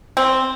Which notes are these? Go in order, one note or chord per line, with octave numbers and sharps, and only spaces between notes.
C4